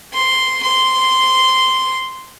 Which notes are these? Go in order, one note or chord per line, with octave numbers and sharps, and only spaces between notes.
C6
C6